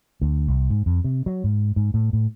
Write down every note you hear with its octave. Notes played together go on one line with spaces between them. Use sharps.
D2
C2
G#2
F2
C3
F#3
G#2
G#2
A2
A2